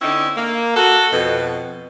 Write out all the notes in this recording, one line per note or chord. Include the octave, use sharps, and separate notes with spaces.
D3 C4 C#4 D#4 E4
A#3
F#4 A4
F2 B2